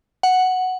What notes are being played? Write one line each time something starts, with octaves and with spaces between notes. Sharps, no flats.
F#5